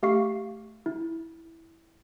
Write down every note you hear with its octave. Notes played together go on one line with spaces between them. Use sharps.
A3 G4 F5 C#6 C7
E4